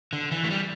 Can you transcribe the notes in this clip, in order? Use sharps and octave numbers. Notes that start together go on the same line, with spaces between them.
D3
E3
A3
G3